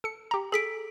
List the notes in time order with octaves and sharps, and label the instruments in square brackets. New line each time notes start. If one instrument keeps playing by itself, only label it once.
[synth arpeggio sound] A4 C#7
G4 A#5
[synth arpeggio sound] G#4 [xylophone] A4 B6 D7